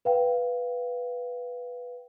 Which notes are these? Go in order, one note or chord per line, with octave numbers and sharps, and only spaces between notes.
B4 F5 G5